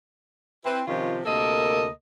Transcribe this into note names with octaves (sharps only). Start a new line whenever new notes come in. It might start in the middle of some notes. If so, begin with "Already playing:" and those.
C4 E4 B4
C3 D#3 F3 C#4 F4 G4
D2 C3 A#3 A4 A#4 D#5